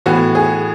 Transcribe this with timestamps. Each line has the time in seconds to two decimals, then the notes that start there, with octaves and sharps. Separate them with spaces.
0.06 A2 E3 B3 F#4
0.35 G#4